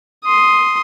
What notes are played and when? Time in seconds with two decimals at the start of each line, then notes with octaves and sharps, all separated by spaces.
0.25 C6 D#6